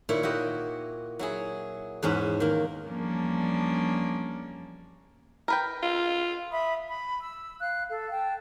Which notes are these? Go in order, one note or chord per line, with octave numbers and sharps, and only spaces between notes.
A#2 D#3 E4 C#5
E4 F#4 G4 D#5
F#3 E4 G#4
E2 G#2 C#4 B4
D#3 A#3
E2 F3 G3 A#3 C#4 D4
A#4 B4 G5
F4
E5 B5 D#6
B5
E6
F5 F#6
A4 F5
G5 A5